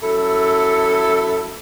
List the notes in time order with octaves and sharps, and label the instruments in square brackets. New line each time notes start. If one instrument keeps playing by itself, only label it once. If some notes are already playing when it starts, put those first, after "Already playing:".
[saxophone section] F#2 E4 A4